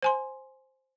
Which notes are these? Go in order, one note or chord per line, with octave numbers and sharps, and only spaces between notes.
C5 G#5 C6